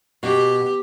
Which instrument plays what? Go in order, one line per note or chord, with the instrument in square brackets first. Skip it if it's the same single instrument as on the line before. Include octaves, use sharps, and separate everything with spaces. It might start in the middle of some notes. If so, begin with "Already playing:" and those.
[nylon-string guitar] B2 [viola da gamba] G4